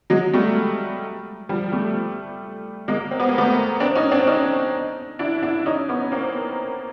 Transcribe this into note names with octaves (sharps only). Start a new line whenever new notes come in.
F#3 G#3
G3 A3
F3 G3
G3 A3
G#3 A#3
C4
B3
A#3
A3 B3
C4 D4
C#4 D#4
C4 D4
C#4 D#4
D4 E4
D4 E4
C#4 D#4
B3 C#4
A#3 C4